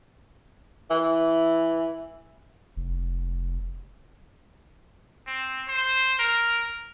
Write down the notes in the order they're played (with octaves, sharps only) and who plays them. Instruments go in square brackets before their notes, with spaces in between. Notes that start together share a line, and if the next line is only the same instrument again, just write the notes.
[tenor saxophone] E3
[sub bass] F1
[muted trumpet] C4
C5
A#4